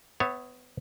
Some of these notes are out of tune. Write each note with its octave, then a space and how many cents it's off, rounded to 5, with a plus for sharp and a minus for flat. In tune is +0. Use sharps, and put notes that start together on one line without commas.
B3 +20 C#5 -15 E5 +0